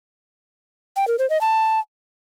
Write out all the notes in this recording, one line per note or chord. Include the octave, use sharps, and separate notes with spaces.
G5
A#4
C5
D#5
A5